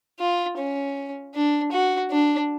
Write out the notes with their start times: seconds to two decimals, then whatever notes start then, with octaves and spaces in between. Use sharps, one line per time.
0.20 F4
0.58 C#4
1.35 D4
1.72 F#4
2.11 D4